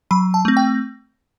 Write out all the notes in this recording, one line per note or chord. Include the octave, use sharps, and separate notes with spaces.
F#3 B5
A5
A3 C4
G5